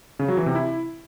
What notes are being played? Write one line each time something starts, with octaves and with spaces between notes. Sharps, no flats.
C#3
F#3
E3
C3
E4